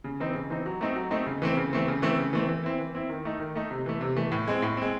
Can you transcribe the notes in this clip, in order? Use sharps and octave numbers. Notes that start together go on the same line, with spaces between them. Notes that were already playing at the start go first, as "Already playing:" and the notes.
C#3
E3 C4 D#4
C#3
E3 C4 D#4
F#3
A3 C4 D#4
F#3
A3 C4 D#4
C#3
E3 A3 C4
C#3
E3 A3 C4
C#3
E3 A3 C4
C#3
E3 A3 C4
E3
C4 E4
E3
C4 E4
D#3
A3 D#4
D#3
A3 D#4
C3
E3 A3
C3
E3 A3
A2
G#3 C4
A2
G#3 C4